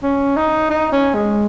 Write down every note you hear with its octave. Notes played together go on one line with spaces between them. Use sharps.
C#4
D#4
D#4
C#4
G#3